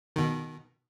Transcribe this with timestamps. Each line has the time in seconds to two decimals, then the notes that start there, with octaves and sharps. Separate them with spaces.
0.16 B2 D#3